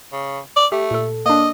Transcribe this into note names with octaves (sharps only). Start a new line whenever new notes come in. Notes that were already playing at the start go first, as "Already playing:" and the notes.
C#3
D5
A3 G4
A#2 A4
A#3 D4 D#5